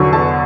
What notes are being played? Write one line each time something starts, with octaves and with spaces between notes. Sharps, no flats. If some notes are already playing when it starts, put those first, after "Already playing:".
Already playing: E2 D3 F#3 C#6
E2 A5